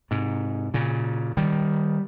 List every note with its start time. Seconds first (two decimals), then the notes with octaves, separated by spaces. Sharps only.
0.11 G#2 C3
0.74 A#2 C#3
1.37 D#3 G3